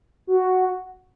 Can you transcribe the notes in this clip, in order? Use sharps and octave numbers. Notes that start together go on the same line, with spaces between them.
F#4